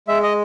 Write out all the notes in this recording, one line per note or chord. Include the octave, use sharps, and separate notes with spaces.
G#3 E5
D#5